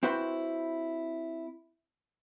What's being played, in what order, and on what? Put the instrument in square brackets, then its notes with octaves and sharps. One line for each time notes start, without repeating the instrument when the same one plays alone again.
[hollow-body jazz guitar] C4 E4 F#4 B4 C5